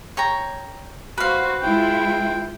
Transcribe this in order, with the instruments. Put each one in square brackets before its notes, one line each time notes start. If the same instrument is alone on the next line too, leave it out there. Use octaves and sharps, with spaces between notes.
[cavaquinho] C#5 G5 A#5
[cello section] F#4 C5 [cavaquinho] B4 F5
[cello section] G#3 E4 F4 [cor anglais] G5